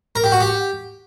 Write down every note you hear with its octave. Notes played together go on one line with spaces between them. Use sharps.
A#4
G4
F#4
G4